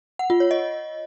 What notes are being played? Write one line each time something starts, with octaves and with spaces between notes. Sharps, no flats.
F#5
F4
C#5
D#5